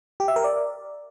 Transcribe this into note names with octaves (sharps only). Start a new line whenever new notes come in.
G4
E5
A#4
D5